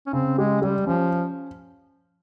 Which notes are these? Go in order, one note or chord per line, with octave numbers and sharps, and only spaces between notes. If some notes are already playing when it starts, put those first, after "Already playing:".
C#4
C#3 C4
G#3 G4
G3 G4
F3 C#4